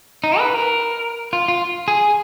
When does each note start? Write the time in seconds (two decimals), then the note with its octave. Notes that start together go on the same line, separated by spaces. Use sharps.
0.24 D#4
0.39 B4
0.54 A#4
1.33 F4
1.48 F4
1.88 G#4